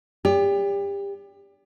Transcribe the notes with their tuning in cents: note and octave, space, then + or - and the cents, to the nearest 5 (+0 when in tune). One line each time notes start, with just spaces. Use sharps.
G4 +30 D5 -40